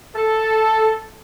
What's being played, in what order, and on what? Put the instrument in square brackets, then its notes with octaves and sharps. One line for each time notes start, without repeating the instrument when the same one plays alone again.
[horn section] A4